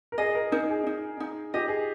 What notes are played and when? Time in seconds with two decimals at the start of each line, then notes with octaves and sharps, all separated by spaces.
0.12 A#4
0.18 G#4 D#5
0.35 A#4
0.52 D#4 A#4
0.70 G#4
0.87 D#4
1.20 D#4
1.54 G4 D#5
1.68 G#4